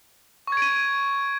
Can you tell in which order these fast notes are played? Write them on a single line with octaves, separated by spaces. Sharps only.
C#6 G#6 D7 D#7